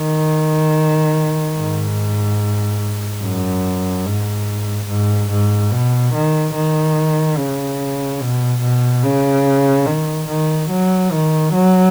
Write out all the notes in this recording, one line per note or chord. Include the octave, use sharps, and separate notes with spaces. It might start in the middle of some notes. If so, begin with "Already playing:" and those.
Already playing: D#3
G#2
F#2
G#2
G#2
G#2
B2
D#3
D#3
C#3
B2
B2
C#3
D#3
D#3
F#3
D#3
F#3